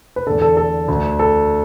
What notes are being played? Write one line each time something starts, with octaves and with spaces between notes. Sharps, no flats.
B4
E2 D3 A4
A4
A4
D2 D3
A4